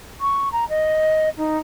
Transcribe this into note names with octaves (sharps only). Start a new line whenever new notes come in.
C#6
A#5
D#5
D#4